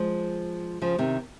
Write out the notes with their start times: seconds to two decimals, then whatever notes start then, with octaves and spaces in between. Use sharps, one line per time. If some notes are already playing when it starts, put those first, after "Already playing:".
Already playing: F3 G#3
0.81 C#3 F3
0.98 C3 D#3